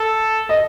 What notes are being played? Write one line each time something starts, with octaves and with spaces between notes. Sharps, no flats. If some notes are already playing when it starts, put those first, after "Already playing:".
Already playing: A4
D#5